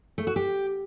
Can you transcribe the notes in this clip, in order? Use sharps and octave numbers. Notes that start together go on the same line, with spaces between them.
A3
F#4
G4